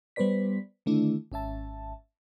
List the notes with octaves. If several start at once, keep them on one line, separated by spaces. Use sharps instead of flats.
G3 B3 B4 C5 D5 B6
D3 D#3 A3 D4 E4
G#1 C#4 E5 A5